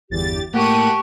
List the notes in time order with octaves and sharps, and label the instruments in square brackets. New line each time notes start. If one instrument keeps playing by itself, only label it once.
[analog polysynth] G1 E2 A6 [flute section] G4
[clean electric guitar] A2 A#3 [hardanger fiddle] G4 [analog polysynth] F#5 D#7 [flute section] A5 C#6